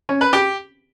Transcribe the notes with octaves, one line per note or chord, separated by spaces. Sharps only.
C#4
B4
G4